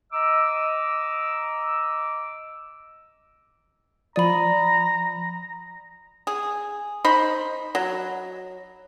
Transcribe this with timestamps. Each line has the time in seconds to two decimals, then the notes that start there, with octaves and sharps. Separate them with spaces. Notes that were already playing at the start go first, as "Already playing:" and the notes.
0.12 D#5 A#5 D6 E6
4.16 F3 D5 A#5 B5 D#6
6.27 G#4
7.04 D#4 C5 B5
7.75 F#3